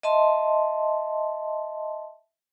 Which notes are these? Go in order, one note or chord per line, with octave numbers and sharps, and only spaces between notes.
D#5 E5 A5 C6